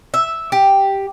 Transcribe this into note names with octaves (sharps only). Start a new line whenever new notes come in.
E5
G4